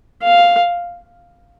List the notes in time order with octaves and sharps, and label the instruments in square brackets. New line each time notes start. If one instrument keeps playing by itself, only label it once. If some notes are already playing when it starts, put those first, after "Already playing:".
[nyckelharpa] F5